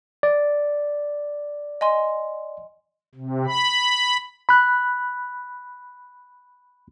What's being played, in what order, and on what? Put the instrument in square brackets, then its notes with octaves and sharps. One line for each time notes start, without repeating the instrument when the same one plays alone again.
[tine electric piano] D5
[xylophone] D#5 G#5 C6
[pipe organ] C3
B5
[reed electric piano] B5 F#6